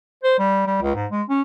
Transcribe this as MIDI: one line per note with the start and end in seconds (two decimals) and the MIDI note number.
0.23 0.37 72
0.39 0.64 55
0.67 0.77 55
0.82 0.94 37
0.95 1.06 44
1.11 1.22 56
1.29 1.42 61